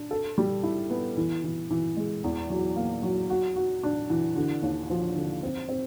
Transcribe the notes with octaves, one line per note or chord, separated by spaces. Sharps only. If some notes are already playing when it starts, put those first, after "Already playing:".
Already playing: D4
A4
G3
E4
B3
E3
E3
E3
G#3
E2
F#3
A#3
F#3
F#4
F#4
D4
E3
D3
D#2
F3
D3
C4
C4